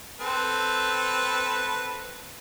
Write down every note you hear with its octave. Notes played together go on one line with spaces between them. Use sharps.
C4 A4 B4